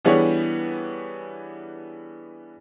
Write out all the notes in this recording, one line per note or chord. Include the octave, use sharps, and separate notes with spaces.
E3 G3 B3 D4 G#4 C#5